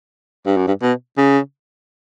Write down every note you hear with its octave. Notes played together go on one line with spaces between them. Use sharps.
G2
F#2
G2
B2
C#3